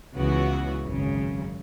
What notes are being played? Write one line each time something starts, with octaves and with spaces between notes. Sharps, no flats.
C#2 C#3 E3 B3 F#4
G#1 F#2 C#3